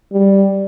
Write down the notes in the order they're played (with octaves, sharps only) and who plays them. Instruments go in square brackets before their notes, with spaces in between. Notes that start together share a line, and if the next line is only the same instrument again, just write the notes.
[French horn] G3